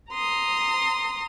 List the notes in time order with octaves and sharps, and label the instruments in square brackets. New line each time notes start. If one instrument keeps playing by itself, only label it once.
[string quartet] A#5 C6 D#6